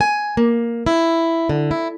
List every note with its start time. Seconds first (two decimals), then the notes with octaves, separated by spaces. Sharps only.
0.01 G#5
0.37 A#3
0.86 E4
1.49 D3
1.71 E4